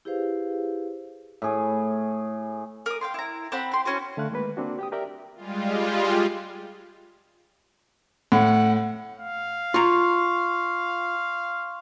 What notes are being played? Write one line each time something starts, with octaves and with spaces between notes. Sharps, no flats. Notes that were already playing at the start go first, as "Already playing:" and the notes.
E4 G4 G#4 B4 C5 F5
A2 G#4
A#4 D#6
F5 G5 C6
E4 A#5
C4 F#5 B5
G5 C6
C#4 E4 F#4 C5
D3 A3 F5 F#6
D#3 G#3 A#3 B4
A#3 C4 D4 F#4
G4 G5 D#6
G4 A#4 D5 E5 G5 A#5
G3 G#3 F4
A2 F#5
F5
F4 A#5 C6 C#6